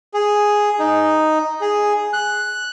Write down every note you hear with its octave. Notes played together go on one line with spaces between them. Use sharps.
G#4
D#4
G#4
F#6